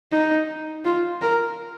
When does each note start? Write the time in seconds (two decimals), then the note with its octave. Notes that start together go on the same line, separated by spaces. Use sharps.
0.12 D#4
0.85 F4
1.21 A#4